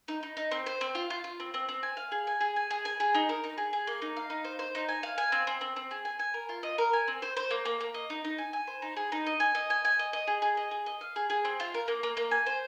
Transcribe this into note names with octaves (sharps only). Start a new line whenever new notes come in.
D#4
D#4
D#4
C4
C5
C4
F4
F4
F4
C4
C4
C4
G#5
F5
G#4
G#5
G#4
G#5
G#4
G#5
G#4
D#4
A#4
D#4
G#4
G#4
A#3
D#4
F5
D#4
C5
C5
D#4
G#5
F5
G#5
C4
C4
C4
C4
G#4
G#5
G#5
A#4
F4
D#5
A#4
G#5
C4
C5
C5
A#3
A#3
A#3
D#5
D#4
D#4
G#5
G#5
C5
D#4
G#4
D#4
D#5
G#5
D#5
G#5
G#5
D#5
D#5
G#4
G#4
D#5
G#4
D#5
F5
G#4
G#4
C4
F4
A#4
A#3
A#3
A#3
G#5
C5